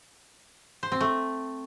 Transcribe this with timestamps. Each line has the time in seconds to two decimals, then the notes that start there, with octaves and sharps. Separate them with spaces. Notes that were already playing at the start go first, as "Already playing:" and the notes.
0.83 C5
0.92 C4
1.01 A3